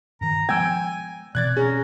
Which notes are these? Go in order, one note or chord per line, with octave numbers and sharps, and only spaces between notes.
G2 D#3 A#5
F3 G#3 B3 G5 G#5 E6 G#6
B2 E3 C4 D5 F#6 G#6 A6
C#4 G#4 A#5